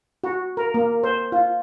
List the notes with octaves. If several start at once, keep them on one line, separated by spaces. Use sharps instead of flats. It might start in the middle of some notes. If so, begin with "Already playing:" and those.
F#4
A#4
A#3
C5
F4